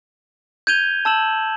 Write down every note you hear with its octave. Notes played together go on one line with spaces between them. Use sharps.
G6 G#6 D#7 F7 G7
A5 E6 E7 F#7